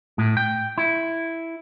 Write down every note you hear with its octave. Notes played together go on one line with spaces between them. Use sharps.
A2
G5
E4